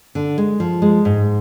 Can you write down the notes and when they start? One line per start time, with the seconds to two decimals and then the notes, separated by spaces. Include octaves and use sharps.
0.15 D3
0.38 G#3
0.60 F3
0.82 G#3
1.05 G#2